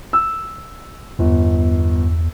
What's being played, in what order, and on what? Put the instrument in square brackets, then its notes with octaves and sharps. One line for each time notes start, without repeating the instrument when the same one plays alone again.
[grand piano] E6
[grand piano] G1 [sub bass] E2